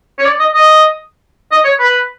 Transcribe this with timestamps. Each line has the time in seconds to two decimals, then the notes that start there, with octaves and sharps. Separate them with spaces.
0.19 C#5
0.25 D5
0.39 D#5
0.53 D#5
1.51 D#5
1.64 C#5
1.79 B4